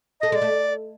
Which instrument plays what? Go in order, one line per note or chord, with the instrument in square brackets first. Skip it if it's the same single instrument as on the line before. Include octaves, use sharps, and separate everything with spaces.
[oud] A3 [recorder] D#5
[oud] G#3 [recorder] D#5
[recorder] D5
[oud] A3